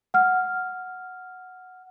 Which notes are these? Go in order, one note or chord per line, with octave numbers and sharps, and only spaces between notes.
F#5 F6